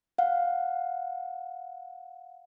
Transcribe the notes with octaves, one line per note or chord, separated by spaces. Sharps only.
F5 F#5